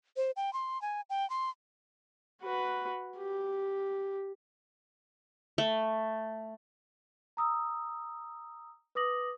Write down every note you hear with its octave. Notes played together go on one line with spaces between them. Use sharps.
C5
G5
C6
G#5
G5
C6
F#4 B4
G4
A3
A#5 D#6 E6
B4 D6 D#6 A#6 F#7